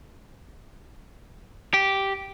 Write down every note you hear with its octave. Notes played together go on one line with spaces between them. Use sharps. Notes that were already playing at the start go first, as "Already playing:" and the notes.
G4